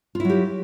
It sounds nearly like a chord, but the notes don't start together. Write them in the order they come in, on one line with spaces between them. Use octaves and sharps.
F4 E4 F#3 G4